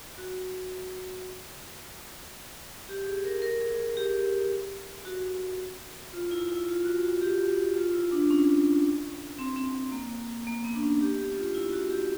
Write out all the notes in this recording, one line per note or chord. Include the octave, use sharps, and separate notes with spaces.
F#4
G4
G#4
A#4
A#4
G#4
G4
F#4
F4
E4
E4
F4
F#4
F#4
G4
F4
E4
D4
C#4
C4
C4
C4
A#3
A#3
B3
D4
C#4
G4
G4
F4
E4
F#4
G4